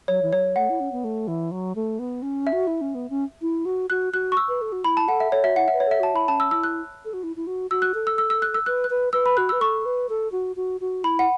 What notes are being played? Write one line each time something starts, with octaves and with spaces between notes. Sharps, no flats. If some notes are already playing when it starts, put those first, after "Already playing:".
F#3 C#5
E3
F#3 C#5
A3 F#5
E4
C#4
B3
A3
E3
F#3
A3
B3
C#4
E5
F#4
E4
C#4
B3
C#4
E4
F#4
F#4 F#6
F#4 F#6
C#6
E6
B4
A4
F#4
E4 B5
A5
A4 F#5
E5
A4 C#5
F#4 E5
E4 F#5
E5
B4
C#5
A4 E5
F#4 A5
E4 B5
C#4 A5
E6
E4 E6
F#6
A4
F#4
E4
E4
F#4
F#4 E6
F#6
A4
E6
E6
E6
F#6
E6
B4 F#6
F#6
B4
B4 E6
B5
F#4 F#6
E6
B4
A4 C#6
B4
A4
F#4
F#4
F#4
E4 B5
F#5